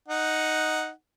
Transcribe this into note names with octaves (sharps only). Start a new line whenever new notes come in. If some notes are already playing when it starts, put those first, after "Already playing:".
D#4 F#5